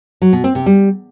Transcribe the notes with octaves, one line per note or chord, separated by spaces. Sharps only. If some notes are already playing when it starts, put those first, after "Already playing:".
F#3
B2
C4
C3
G3